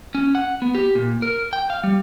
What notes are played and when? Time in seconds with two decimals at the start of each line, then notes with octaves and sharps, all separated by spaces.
0.15 C#4
0.35 F#5
0.62 B3
0.75 G4
0.95 A#2
1.22 A#4
1.53 G5
1.70 F5
1.83 G3